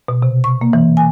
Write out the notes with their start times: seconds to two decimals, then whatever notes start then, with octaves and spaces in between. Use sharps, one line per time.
0.08 B2
0.22 C3
0.44 C#6
0.61 A#3
0.73 E3
0.97 G#5